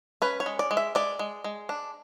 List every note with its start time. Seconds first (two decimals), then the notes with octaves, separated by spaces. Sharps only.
0.22 C#4 B4
0.40 C#5
0.46 G#3
0.59 D5
0.71 G#3
0.77 E5
0.95 G#3 D5
1.19 G#3
1.44 G#3
1.69 D4